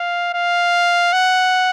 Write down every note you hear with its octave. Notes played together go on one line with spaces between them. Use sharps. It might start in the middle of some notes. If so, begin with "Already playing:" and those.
Already playing: F5
F5
F#5